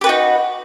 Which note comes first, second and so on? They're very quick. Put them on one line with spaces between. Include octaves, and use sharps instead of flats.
G4 B4 F#4 D#4